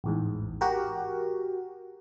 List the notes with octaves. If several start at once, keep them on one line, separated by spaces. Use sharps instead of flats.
A1 E2 G#2
F#4 G4 A#4